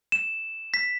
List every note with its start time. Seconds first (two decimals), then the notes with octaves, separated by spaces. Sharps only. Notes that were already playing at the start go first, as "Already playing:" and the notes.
0.12 E7
0.74 B6